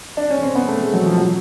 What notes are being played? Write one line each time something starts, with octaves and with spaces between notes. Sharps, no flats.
D4
C#4
C4
B3
A3
G#3
F#3
F3
F#3